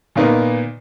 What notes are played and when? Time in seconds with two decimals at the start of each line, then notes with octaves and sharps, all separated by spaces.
0.16 A#2 D#3 A#3 B3 D#4